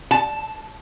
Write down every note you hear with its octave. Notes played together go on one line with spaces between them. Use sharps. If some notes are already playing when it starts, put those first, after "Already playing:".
A5